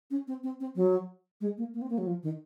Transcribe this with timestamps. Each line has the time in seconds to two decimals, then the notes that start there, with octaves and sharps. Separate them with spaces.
0.11 C#4
0.28 C4
0.44 C4
0.60 C4
0.76 F#3
1.41 G#3
1.58 A#3
1.74 A#3
1.82 C4
1.90 A#3
1.98 F#3
2.06 F3
2.23 D#3